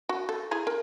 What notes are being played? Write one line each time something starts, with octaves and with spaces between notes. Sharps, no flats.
F#4
A4
E4 G#4 A#5
A#4